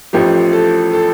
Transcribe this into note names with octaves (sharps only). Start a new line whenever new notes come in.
A1 A2 F3 G4
A4
A4